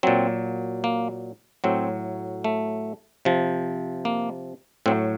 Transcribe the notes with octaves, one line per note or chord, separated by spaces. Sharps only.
A#2 F#3 C4
A#3
A2 F#3 C4
A3
C3 F3
A#3
A2 F#3 C4